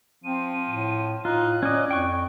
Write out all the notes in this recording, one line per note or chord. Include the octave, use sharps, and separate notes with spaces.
F3 C4 D#7
A2
A2 D#4 F4 F#6
C#4 D5 D#5
F2 G5 C#6